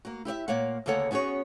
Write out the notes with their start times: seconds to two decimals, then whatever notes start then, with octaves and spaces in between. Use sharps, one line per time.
0.05 A#3 F#4
0.25 E4 G4 D5 E5
0.48 A#2 A#3 C#5 F5 F#5
0.86 D2 C#3 A#3 A4 C#5 F#5
1.11 B3 C#4 F#4 G#4 C#5